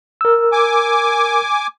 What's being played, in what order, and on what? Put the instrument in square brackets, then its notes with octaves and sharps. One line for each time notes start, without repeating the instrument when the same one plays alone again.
[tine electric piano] A#4 E6
[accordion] G#5 D6